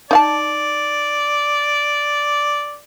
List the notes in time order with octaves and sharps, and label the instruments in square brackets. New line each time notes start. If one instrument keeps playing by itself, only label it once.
[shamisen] D#4 F5 A5 [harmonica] D5